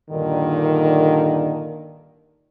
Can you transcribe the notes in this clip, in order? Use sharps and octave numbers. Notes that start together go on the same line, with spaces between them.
G2 A#2 D3 D#3